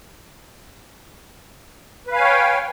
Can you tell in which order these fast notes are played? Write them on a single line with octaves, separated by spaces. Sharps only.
B4 F5 G#5 C#5 G5